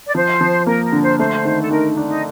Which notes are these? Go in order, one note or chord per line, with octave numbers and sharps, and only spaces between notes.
D5
F3 C5
F3
A#3 A#4
A#4
D3
C5
A3 C5
D#3
A4
D#3 A#4
D4
D#4